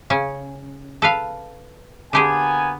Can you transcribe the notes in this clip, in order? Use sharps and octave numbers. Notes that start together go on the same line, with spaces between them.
C#3 C#4
A4 B4 F5
D3 A#3 B3 G4 G#4 G#5